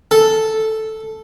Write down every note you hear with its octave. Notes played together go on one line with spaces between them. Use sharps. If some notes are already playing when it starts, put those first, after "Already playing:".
A4